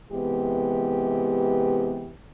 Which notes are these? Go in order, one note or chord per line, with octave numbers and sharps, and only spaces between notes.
C3 E3 G#3 B3 G4